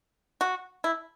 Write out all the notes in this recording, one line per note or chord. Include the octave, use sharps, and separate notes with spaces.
F#4
E4